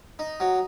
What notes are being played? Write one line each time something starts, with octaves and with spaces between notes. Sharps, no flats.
D#4
F#3